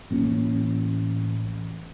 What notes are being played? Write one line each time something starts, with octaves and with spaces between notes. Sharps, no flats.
A1 A#3 C4 C#4